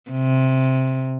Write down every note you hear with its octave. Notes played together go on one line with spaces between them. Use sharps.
C3